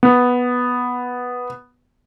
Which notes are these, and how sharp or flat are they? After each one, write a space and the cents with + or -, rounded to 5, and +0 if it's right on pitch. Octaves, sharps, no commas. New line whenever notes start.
B3 -5